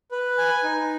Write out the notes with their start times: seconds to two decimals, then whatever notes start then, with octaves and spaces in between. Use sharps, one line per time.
0.11 B4
0.38 G#5
0.64 D#4